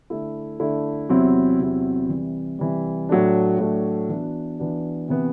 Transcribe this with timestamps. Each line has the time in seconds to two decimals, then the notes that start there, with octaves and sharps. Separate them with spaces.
0.10 D3 A3 E4
0.60 D3 A3 E4
1.09 E2 C3 F#3 C4 E4
1.59 E2 C3 F#3 C4 E4
2.09 C3 E3 G3
2.59 C3 E3 G3
3.09 A2 F#3 A3 D4
3.59 A2 F#3 A3 D4
4.09 E3 B3 D4 F#4
4.59 E3 B3 D4 F#4
5.09 C3 E3 B3